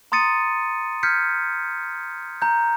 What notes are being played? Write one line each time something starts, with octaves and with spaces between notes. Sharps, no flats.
A#5 C6 D#6 A6 C#7 D#7
F6 G6 G#6 B6 C#7
A#5 G6